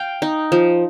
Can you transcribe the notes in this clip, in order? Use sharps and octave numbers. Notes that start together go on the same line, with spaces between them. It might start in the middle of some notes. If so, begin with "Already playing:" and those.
Already playing: F5 G5
D#4
F3